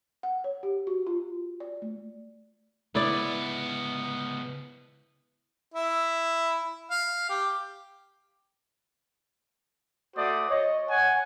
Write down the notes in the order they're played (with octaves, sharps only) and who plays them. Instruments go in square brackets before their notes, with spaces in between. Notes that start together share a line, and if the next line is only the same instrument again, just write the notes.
[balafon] F#5
C#5
G4
F#4
F4
D5
A3
[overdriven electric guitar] C#2 B3 [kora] E4 D5
[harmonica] E4
F5
G4
[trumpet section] A3 F#4 C5 D5 D#6
C#5 D#5
C#5 F#5 G#5